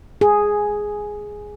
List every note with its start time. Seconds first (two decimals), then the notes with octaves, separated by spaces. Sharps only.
0.21 G#4